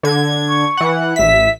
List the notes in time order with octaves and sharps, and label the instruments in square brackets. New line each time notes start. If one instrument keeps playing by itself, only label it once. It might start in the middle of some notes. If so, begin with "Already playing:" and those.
[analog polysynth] D3 G#6
[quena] C#6
[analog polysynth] E3 F#5
[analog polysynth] A1 B6 [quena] E5